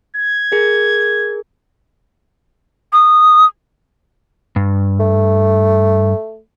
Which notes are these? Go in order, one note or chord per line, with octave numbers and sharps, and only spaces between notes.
G#6
G#4 A#4
D#6
G2
A3